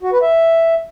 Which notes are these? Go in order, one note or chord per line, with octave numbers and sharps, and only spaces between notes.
F#4
B4
E5